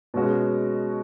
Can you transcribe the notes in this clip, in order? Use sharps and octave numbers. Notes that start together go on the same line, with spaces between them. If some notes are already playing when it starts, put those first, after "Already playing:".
B2 G#3 C#4 F#4